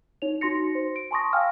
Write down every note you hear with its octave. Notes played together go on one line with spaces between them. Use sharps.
D#4 C#5 F7
D#4 F#4 C6 A#6 C#7
C5
D7
G#5 A5 C6 C#6 D#6 A#6
F5 G5 G#5 E6 F6